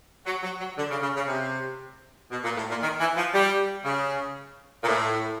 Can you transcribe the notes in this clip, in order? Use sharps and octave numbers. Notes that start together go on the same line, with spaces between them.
F#3
F#3
F#3
D3
C#3
C#3
C#3
C3
B2
A#2
A2
A#2
D#3
E3
F3
G3
C#3
A#2
A2